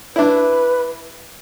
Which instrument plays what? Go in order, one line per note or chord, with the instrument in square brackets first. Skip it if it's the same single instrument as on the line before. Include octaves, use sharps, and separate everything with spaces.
[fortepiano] D4 E4 [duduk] B4